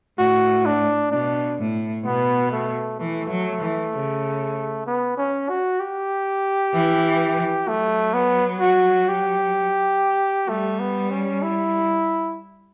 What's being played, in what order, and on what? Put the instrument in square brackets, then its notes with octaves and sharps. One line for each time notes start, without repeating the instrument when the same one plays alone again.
[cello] A2 [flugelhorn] F#4
[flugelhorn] D4
[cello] B2 [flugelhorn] D4
[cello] A2
[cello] B2 [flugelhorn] B3
[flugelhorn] A3
[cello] E3 [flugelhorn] A3
[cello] F#3
E3
C#3
[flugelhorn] B3
C#4
F#4
G4
[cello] E3
[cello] F#3 [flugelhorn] A3
[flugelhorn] B3
F#4
G4
[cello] G3 [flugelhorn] A3
[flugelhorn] B3
C#4
E4